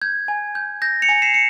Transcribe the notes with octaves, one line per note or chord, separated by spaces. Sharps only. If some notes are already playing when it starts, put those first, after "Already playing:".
G6 G#6
G#5
G6
G6 A#6
C#7 F7
G#5
C7 E7
C#7